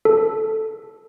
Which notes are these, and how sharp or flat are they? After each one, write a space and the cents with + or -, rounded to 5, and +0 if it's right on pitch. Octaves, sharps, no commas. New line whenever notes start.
A4 -5